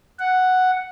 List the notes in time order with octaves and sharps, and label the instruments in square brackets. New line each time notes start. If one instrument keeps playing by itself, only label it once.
[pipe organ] F#5